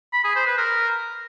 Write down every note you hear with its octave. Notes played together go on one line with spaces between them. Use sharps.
B5
G#4
C5
B4
A#4